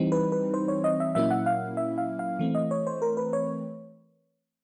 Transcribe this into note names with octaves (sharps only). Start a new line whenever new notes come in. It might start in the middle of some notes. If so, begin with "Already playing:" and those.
Already playing: E3 G3 C4 D#4
B4
B4
C5
C#5
D#5
E5
A#2 F#3 A#3 C#4 E4 E5
F#5
F5
E5
F5
F5
E3 A3 C4
D#5
C#5
C5
A#4
B4
C#5